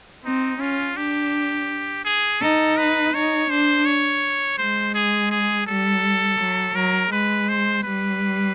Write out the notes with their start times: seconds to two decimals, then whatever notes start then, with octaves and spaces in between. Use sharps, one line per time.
0.24 C4 D#4
0.60 C#4 F4
0.97 D4 G4
2.05 G#4
2.41 D#4 A4
2.77 B4
3.14 D#4 C#5
3.50 D4 C5
3.86 C#5
4.58 G#3 C5
4.94 G#4
5.31 G#4
5.67 G3 A4
6.40 F#3
6.75 F#3 A#4
7.12 G#3 B4
7.48 C5
7.84 G3 B4